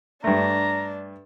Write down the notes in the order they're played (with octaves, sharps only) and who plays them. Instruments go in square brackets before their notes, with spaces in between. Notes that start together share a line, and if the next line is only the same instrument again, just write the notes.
[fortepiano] G2 A3 [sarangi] D4 [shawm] A#5